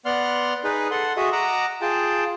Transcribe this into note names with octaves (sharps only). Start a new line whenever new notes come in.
B3 D5 F#5 C6 F6
D#4 G#4 B4
A4 F#5 C6
F#4 G#4 D#5 E5
D#5 F#5 A#5 D6 E6
F4 G#4 G5 A5